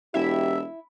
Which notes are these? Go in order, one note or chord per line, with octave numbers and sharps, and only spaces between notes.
E1 E4 G4 E5